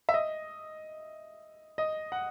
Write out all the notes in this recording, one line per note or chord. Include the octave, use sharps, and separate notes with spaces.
E5
D#5
D#5
F#5